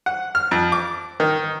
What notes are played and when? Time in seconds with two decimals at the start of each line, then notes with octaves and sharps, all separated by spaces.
0.06 F#5
0.35 F6
0.51 F2
0.72 D6
1.20 D#3